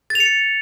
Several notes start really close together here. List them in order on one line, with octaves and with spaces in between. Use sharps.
A6 F7 C#7